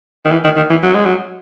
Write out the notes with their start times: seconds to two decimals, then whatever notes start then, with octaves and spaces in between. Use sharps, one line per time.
0.25 D#3
0.32 E3
0.44 D#3
0.56 D#3
0.70 E3
0.83 F#3
0.94 G#3
1.05 F#3